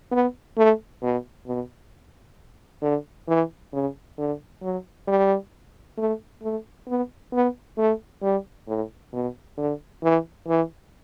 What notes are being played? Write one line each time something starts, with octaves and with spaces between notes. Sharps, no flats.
B3
A3
B2
B2
D3
E3
C#3
D3
F#3
G3
A3
A3
B3
B3
A3
G3
A2
B2
D3
E3
E3